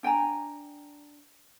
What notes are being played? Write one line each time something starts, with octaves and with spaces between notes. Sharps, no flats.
D4 G5 G#5 A#5